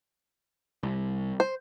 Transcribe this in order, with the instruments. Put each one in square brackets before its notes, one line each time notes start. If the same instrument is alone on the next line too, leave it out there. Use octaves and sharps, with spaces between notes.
[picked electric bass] C2
[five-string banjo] C5